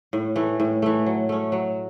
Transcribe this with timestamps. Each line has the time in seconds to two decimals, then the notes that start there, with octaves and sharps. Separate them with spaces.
0.13 A2
0.36 E3 A3
0.60 A2
0.82 E3 A3
1.06 F#3
1.29 A3 C#4
1.52 F#3